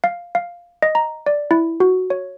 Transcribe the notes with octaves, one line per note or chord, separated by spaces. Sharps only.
F5
F5
D#5
A#5
D5
E4
F#4
C#5